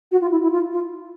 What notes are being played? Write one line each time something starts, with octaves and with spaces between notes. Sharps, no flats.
F#4
F4
E4
E4
F4
F4